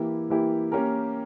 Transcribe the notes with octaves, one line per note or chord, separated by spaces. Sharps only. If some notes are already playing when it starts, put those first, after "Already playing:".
Already playing: E3 A#3 E4 G4
E3 A#3 E4 G4
A#3 C#4 G4 A#4